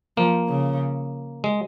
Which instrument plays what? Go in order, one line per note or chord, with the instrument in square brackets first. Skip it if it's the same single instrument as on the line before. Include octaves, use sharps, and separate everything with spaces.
[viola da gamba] F3 [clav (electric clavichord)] A#3
[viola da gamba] C#3
[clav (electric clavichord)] G#3